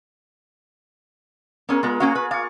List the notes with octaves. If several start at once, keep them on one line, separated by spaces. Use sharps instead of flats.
A#3 B3 C#4 G#4 A#4
G#3 B3 F4 A#4
A#3 C#4 F4 F5 G#5
B4
D5 F5 C#6